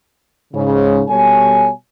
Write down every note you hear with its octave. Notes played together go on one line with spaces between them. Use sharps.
G#2 C#3
B2 G3 A4 C#5 G#5